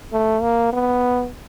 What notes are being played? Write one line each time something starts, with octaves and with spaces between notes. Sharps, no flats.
A3
A#3
B3